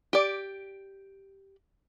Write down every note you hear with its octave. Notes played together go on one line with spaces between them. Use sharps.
G4 D5